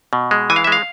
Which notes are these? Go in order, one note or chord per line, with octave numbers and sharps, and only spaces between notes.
B2
G#3
E3 G#5
F5
E5
G#3 F5